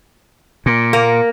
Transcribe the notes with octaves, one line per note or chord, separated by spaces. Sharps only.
A#2
A#3